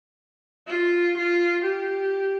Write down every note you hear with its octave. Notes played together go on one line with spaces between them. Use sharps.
F4
F4
G4